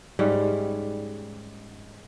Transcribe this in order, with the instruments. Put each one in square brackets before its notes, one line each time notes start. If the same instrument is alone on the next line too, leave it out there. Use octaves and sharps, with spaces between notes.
[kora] G#2 G3 C#4